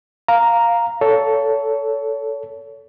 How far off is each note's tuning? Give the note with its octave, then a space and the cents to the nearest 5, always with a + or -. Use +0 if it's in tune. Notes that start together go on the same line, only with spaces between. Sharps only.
F5 +0 A#5 +0
A4 +0 C#5 +30